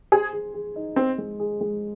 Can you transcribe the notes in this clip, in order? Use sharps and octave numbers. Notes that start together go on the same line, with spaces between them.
G#4 C5
G#4
G#4
D#4
C4 C5
G#3
G#4
G#3